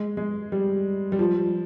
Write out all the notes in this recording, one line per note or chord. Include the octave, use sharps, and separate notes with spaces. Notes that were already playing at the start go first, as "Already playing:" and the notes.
Already playing: G#3
G#3
G3
G3
F3